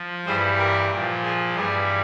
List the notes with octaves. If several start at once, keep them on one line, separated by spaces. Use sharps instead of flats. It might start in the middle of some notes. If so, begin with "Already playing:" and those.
Already playing: F3
G2 E3 G3 G#4 C5
G4 A#4
A#2 F3
G#4
G2 E3 G3 G#4